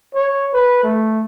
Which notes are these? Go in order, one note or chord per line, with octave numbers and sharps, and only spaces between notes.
C#5
B4
A3